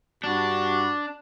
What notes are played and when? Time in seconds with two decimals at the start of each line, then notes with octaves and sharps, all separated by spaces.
0.24 G2 D4 F#4